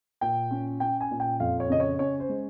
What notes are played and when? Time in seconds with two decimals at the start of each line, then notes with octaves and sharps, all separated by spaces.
0.21 A#2 G5
0.51 C#4
0.80 C#4 G5
1.01 G#5
1.11 A#2
1.20 G5
1.40 F2 F5
1.60 C#5
1.70 C#3 D#5
1.80 C#5
1.99 C#4 C#5
2.20 C5
2.29 G#3